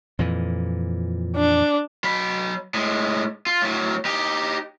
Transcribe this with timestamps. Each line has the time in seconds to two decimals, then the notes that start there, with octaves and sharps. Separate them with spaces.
0.19 F2 A#2 E3
1.36 D4
2.04 F#3 B5
2.74 A2 G#3
3.46 F4
3.62 A2 F#3
4.05 D#4 G4